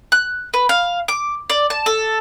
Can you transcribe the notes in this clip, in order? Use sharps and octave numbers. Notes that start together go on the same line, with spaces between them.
F#6
B4
F5
D6
D5
A5
A4